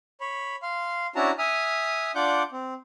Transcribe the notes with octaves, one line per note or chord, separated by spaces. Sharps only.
C#5 B5
F5 C6
C#4 D4 E4 F#4 A5 A#5
E5 G#5 D#6 F6
D4 F4 D5 F#5 D6 G6
C4